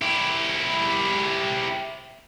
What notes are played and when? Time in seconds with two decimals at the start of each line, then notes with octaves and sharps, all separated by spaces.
0.02 E4 G4